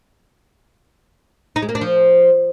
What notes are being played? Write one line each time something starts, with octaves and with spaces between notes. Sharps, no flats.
D#4
G#3
A#3
D4
F3